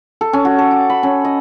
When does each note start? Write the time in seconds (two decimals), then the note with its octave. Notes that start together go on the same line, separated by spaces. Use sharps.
0.21 A4
0.33 C#4
0.45 F#4
0.59 A4
0.71 D6
0.90 B5
1.03 C#4
1.25 D#5